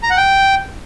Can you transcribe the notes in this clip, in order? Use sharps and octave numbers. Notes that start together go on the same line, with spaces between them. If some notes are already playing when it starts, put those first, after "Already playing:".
A#5
F#5
G5